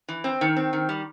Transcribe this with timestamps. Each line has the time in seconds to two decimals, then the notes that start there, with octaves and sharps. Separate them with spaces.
0.08 E3
0.24 C4
0.41 D#3
0.57 C4
0.73 D#3
0.89 G3